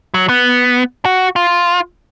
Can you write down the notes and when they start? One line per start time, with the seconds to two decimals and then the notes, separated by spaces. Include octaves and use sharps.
0.14 F#3
0.29 B3
1.05 F#4
1.36 F4